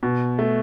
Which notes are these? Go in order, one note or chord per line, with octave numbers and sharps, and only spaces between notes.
B2
A3